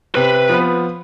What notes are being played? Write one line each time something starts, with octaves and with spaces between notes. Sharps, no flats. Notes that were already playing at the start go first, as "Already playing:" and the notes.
C3 B4
F3 B3